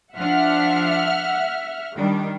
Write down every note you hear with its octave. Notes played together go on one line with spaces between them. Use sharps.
F3 D4 E5 F#5 F6
D#3 G3 D4